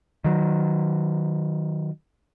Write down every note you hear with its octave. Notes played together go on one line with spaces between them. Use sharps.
D#3 F#3